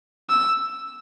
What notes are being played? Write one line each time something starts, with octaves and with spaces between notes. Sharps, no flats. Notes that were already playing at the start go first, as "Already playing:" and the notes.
E6